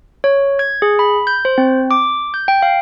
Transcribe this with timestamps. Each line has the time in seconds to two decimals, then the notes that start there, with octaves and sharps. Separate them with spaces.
0.24 C#5
0.59 G#6
0.82 G#4
0.99 B5
1.27 G6
1.45 C5
1.58 C4
1.91 D6
2.34 G6
2.48 G5
2.62 F5